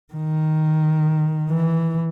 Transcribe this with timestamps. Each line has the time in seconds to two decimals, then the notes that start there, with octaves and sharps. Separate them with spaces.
0.13 D#3
1.50 E3